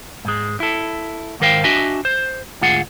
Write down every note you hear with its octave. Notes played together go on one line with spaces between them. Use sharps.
G#2 G#3
E4 A4
G#2 D#3 A#4 C5 F5 G5
D4 F#4 D#5 E5 G#5
C5
D2 G#2 F4 G#4 F#5